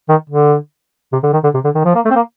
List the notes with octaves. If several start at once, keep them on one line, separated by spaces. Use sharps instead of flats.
D#3
D3
C3
D3
D#3
D3
C3
D3
D#3
F3
A#3
A3
C4
A#3